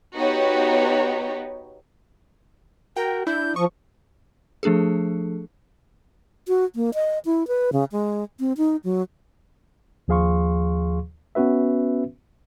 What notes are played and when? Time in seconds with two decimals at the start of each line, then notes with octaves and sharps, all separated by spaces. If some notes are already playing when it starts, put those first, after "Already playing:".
0.16 B3 D#4 F#4 G4 C#5
2.96 F#4 A#4 G5
3.27 D4 E4 G6
3.56 F3 C#6 D#6
4.63 F3 A3 D4 G#4 A4
6.48 F#4
6.75 A#3
6.94 D#5
7.25 E4
7.48 B4
7.73 C#3
7.92 G#3
8.40 C4
8.57 D#4
8.84 F#3
10.08 D#2 F3 G#4 F5 C6 C#6
11.35 B3 C#4 F#4 B4 E5